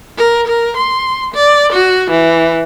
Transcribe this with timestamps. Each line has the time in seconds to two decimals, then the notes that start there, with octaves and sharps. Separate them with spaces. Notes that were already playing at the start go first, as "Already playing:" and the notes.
0.18 A#4
0.47 A#4
0.77 C6
1.35 D5
1.73 F#4
2.11 E3